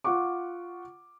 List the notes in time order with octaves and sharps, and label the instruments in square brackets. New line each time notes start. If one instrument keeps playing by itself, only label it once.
[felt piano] F4 F#5 C#6 D6